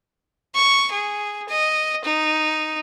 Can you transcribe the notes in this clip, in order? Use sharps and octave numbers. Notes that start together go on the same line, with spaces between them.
C#6
G#4
D#5
D#4